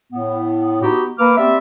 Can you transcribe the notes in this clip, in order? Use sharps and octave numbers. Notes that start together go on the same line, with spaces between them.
A2 B3
B3 D#4 F#4 G4
A#3 B4 D6 F6
B3 C4 G4 D5 E5